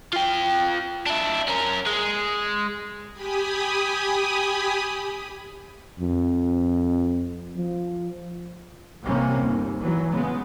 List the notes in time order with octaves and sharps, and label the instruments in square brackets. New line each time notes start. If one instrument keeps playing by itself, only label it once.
[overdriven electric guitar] F4 G5
D4 E4
C#4 A#4
G#3
[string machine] G4 G#5 B5 D#6
[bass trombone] F2
F3
[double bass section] A1 C3 G3 A#3 C4 C#4
G1 D#2
E3 F#3
C#3 G#3 B3